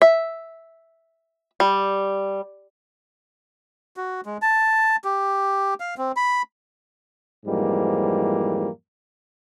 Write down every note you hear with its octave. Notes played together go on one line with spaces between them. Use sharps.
E5
G3
F#4
G#3
A5
G4
F5
C4
B5
F2 G#2 E3 G3 A#3